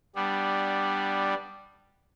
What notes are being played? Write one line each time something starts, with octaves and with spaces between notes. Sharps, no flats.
G3 B3 D4